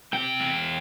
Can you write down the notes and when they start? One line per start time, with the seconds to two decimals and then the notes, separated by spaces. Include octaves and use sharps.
0.13 C3 G5
0.40 E2